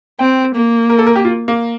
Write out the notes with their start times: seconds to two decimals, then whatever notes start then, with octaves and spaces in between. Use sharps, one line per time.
0.19 C4 G5
0.55 A#3
0.90 A#4
0.99 A4
1.07 A#4
1.16 G4
1.25 F4
1.48 A#3